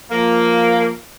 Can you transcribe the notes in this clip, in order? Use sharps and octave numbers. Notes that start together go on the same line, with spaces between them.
F3 A#3